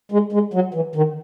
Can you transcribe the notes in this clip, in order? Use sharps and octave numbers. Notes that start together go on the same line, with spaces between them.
G#3
G#3
F#3
E3
D#3